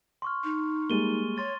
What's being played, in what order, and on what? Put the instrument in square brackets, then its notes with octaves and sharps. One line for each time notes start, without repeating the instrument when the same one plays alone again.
[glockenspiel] C6 C#6 F6
[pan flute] D#4
[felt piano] G3 G#3 A#3 [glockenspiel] A6 D#7 G7
[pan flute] C#5 [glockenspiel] C6 A6